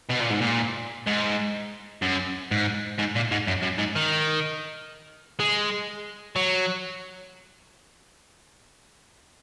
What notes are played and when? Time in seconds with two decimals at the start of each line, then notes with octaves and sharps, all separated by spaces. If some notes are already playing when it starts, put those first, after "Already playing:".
0.10 B2
0.21 A#2
0.31 G#2
0.41 A#2
1.07 G#2
2.02 F#2
2.51 G#2
2.98 G#2
3.15 A#2
3.31 G#2
3.47 F#2
3.62 F#2
3.78 G#2
3.96 D#3
5.40 G#3
6.36 F#3